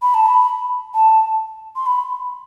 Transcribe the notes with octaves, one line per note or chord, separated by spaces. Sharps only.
B5
A5
B5
A5
C6
B5